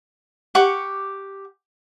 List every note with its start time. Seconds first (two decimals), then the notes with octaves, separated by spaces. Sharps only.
0.55 G4 F#5 C#6 D6